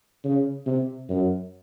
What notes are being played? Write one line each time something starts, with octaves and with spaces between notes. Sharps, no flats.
C#3
C3
F#2